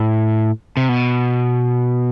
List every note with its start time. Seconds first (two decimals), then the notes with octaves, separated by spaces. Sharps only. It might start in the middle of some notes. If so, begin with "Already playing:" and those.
Already playing: A2
0.77 C3
0.89 B2